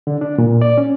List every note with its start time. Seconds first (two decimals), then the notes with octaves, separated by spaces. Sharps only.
0.07 D3
0.21 D4
0.38 A#2
0.62 D5
0.78 C#4